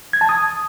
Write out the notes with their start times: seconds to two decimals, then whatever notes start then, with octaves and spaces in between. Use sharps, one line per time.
0.13 G#6
0.21 A5
0.29 D#6